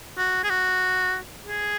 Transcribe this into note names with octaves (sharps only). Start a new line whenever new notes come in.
F#4
G#4
F#4
G#4